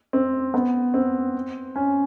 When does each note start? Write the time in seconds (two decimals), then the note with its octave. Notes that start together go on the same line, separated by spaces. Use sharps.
0.13 C4
0.54 B3
0.94 C4
1.76 C#4